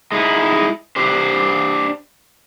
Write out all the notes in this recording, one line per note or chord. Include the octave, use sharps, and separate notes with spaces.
G#3 D#4 E4
D4 G4 C5